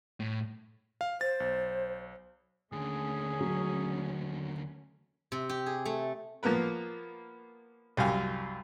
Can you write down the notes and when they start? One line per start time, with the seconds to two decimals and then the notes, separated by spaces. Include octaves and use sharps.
0.20 A2
1.01 F5
1.21 C5 A6
1.40 B1
2.72 D#2 D3 A3 C#4 G#4
3.41 F#3
5.32 C3
5.49 G4
5.66 G#4
5.85 A3
6.43 F3 A#3 B3 A#4 B4
7.97 C2 F#2 G4 F5 G#5